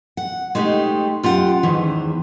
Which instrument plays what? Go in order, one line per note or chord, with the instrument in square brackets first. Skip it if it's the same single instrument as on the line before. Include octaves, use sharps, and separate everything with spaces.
[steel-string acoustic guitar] F#5
G#3 A3 D#4 G4 C5
F#2 F4 G4 F#5
E2 G#2 D#3 E3